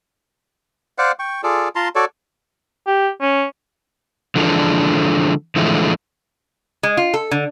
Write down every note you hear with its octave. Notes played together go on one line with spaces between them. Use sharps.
C5 D5 F5 F#5
G5 C#6
F4 G#4 A4 D5
F4 A5 A#5 C6
F#4 A4 C#5 D5
G4
C#4
D3 E3 F3 G#3 D4 A4
D3 E3 F3 G#3 A3
G#3
F4
A4
D3